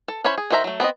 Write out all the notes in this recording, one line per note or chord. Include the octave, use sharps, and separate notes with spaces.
A4
C#4 E4 C5 C#5 B5
G#4
D#3 F#4 C5 E5 A#5
F#3 A3
B3 C4 D5 D#5